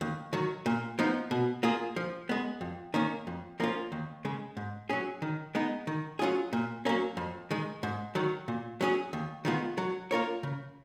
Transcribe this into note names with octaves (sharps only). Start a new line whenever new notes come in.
D#2
D#3 F#3
A#2
F3 B3 D#4
B2
A#3 F4 G#4
F3
G#3 B3
F2
D#3 A#3 C#4
F2
F3 A#3 C#4 F4
D#2
C#3 G#3
G#2
F#3 C#4 G#4
D#3
G#3 B3 D#4
D#3
F#3 C#4 F4 G#4
A#2
F#3 A#3 C#4
F2
D#3 G#3
G#2
D#3 F#3
A#2
F#3 C#4 G#4
D#2
D#3 G#3 B3 F4
F#3
A#3 F4 A#4 C#5
C#3